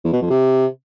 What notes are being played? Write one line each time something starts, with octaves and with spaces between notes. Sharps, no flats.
E2
B2
F2
C3